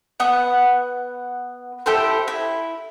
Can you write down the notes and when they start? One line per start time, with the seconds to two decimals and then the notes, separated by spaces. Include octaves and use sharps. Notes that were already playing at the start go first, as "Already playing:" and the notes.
0.20 B3 F#5
1.86 E4 G4 A4 C5
2.28 E4